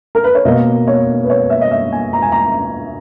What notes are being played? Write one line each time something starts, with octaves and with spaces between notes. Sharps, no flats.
A#4
B4
C#5
B2 A#3 D#5
C#5
B4
C#5
E5
D#5
E5
G#5
A#5
G#5
A#5